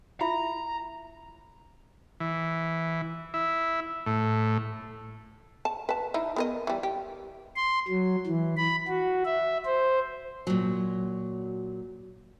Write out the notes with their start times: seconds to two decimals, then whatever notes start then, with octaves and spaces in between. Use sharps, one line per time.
0.21 E4 F4 E5 A#5
2.20 E3
3.34 E4
4.06 A2
5.65 A5
5.89 B4 A5
6.14 D#4 E4
6.36 B3 A#4 D#5
6.67 E3 G3
6.83 G4
7.56 C6
7.88 F#3
8.26 E3
8.57 B5
8.88 F#4
9.25 E5
9.65 C5
10.47 A#2 F#3